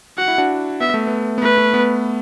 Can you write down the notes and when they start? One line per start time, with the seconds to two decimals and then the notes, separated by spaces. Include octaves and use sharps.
0.18 F#4 F#5
0.28 E4
0.38 D4 F#4
0.80 B3 E5
0.94 A3
1.07 B3
1.38 B3
1.43 A3 B4
1.58 A3
1.74 B3